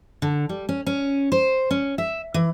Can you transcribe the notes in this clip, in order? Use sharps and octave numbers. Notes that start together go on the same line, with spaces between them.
D3
G3
C#4
C#4
C5
C#4
E5
E3